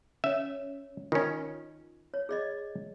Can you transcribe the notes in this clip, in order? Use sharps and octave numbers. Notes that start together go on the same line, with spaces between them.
C#4 C#5 E5
D#3 C#4 F4
C#5
G#4 D5 D#5